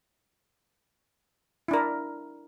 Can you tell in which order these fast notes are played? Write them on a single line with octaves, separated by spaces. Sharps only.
E4 D4 A#4